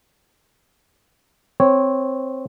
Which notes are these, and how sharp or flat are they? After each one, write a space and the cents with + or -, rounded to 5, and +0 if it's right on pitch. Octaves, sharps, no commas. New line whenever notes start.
C4 +0 C#5 -10